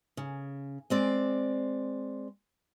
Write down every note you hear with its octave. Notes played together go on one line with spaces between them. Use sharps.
C#3
G#3 C4 D5